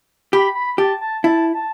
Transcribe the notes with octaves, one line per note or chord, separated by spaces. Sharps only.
G4 B5
B5
G4 A5
A5
E4 A5
A5